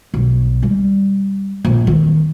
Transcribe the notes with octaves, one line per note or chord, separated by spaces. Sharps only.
B1
G3
A#1
D#3 C4